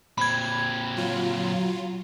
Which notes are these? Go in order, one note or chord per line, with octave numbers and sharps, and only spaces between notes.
A#2 C4 B5 G#6
F#3 F4